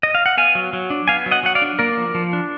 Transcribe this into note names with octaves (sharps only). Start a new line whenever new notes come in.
D#5
F5
F#5
B3 F5 G#5
F#3
F#3
D4
B3 F5 G#5
F#3
D#5 F#5
F#3 F#5
D5 F5
D4
A#3 A#4 D5
F3
F3
D4